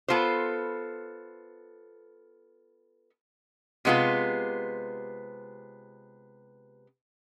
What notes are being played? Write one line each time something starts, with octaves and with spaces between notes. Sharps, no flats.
B3 F4 A4 C5
C3 G#3 B3 F4